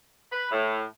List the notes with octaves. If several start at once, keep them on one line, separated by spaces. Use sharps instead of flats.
B4
A2